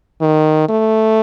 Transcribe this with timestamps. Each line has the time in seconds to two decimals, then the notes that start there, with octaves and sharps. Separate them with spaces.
0.21 D#3
0.69 A3